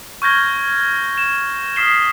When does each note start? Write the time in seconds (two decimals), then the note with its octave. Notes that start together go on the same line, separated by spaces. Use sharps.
0.22 C#6 F6 G6 G#6 A#6 G7
1.18 E7
1.76 D#6 F6 B6 C7 E7 G7